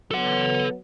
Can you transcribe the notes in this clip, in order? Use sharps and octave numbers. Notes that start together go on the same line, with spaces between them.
F#3 B3 A4 F#5